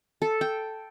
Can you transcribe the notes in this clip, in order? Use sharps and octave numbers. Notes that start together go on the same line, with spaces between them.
A4
G5